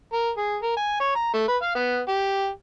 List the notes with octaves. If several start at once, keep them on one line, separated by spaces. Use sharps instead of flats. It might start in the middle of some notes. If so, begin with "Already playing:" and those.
A#4
G#4
A#4
G#5
C#5
A#5
A3
B4
F5
B3
G4